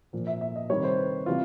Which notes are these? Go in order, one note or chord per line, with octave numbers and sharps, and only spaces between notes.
A#2 F3
E5
E5
D#5
C3 D#3 G3 C#5
C5
B4
C3 E3 G3 F4